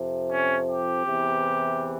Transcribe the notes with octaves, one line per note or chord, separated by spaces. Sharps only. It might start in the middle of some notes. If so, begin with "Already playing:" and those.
Already playing: F2 C3 F3
C#4
G4
E2 C3 E3